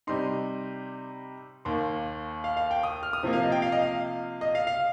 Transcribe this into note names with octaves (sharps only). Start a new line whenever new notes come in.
C3 G3 D#4 C6
D#2 D#3 A#3 C6
F5
F5
G5
D#6
F6
D#6
C3 F3 A#3
F5
D#5
G5
F5
D#5
F5
D#5
F5
F5